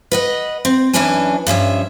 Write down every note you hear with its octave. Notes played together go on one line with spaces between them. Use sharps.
B4 D#5 F#5
C4
F#2 E3 C#4 D4 B4 G#5
G2 F3 C#4 E5